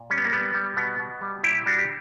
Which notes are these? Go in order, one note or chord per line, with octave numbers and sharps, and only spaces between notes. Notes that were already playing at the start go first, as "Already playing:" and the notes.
Already playing: A#2
G3 C#4
B3
A#3
G3 B3
G3
B2 B3
B2
G3
A#2 E4 G4
G3 D4 F#4
G4